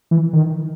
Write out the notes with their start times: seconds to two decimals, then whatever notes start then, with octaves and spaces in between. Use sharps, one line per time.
0.11 E3
0.33 D#3